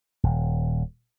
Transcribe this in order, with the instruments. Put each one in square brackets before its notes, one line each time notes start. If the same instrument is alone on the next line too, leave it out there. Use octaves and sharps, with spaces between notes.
[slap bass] D#1